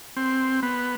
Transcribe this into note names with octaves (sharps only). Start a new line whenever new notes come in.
C4
B3